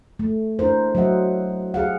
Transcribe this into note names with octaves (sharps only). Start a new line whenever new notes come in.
A3
D4 E4 A#4 C5
F#3 A3 C5 D#5 E5 F#5
G4 G#4 F5 F#5